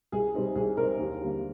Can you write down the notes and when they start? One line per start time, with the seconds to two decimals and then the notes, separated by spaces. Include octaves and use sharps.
0.12 C2 G#4
0.34 C3 G3 C4 D#4
0.55 C2 G#4
0.77 C3 G3 C4 D#4 A#4
0.99 D#2
1.21 D3 G3 A#3